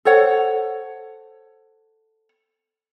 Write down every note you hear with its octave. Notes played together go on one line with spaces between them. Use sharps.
A4 C5 C#5 F#5